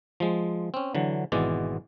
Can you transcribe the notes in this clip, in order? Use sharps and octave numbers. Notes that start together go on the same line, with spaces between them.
F3 G#3
C4 C#4
D3 E3 F#3
G#1 B2 E3 G#3 D5